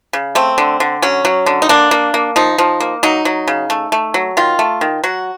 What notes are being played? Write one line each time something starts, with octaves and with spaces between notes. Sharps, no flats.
C#3
A3 C4
D3
D3
F#3 C#4
F#3
D3
D#4
A#3 D4
A#3
A#3
F3 D#4
F3
A#3
F#3 D#4
F#3
C#3
A3
A3
F#3
D#3 F4
A3
D#3
F#3 F#4